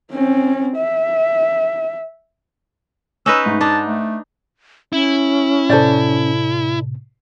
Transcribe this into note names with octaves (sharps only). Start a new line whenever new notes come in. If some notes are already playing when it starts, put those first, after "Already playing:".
C4 C#4
E5
C#4 D#4 B4 E6
G#2 A3
D4 D#4 A5
A3
C#4 E4
A2 C3 A4 C5 D5